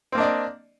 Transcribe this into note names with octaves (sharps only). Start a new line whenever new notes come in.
A#3 C4 D4 D5 D#5